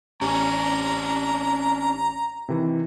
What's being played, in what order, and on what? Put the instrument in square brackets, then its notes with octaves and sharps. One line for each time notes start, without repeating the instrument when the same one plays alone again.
[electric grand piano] A1 G4 [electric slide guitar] C#4 D4 C#5 [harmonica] A#5
[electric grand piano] C3 D#3 E3